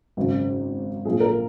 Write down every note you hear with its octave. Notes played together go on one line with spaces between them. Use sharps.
G#1 F#2 C#3
A#1 A#2 G#4
A#4